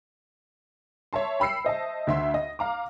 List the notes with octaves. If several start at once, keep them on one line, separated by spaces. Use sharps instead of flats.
C#5 E5 A5 C6
G5 B5 E6 C7 C#7
C5 D#5 E5 A5
D2 E5 C6
D#5
F5 A#5 D6